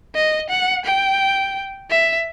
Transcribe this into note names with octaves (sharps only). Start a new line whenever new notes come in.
D#5
F#5
G5
E5